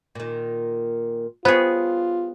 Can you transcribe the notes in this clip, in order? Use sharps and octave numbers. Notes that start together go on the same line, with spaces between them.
A#2 D#3
G3 B3 F4 G#4 A#4 C5 C#5